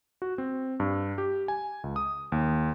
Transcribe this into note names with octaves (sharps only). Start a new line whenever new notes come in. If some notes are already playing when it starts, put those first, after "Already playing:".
F#4
C4
G2
G4
G#5
C#2
D#6
D#2